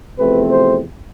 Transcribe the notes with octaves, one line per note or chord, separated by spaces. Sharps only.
E2 C3 F3 A3 C4 B4
C5